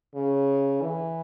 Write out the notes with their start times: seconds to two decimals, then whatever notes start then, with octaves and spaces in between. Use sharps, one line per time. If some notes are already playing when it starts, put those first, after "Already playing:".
0.15 C#3
0.82 E3